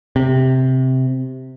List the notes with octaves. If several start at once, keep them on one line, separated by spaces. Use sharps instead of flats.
C3